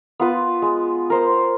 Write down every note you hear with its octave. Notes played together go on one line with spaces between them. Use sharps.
B3 F4 B4
G#3
A#4 C5